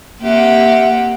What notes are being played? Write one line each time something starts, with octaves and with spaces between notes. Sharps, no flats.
A#3 C4 G4 E5 F#5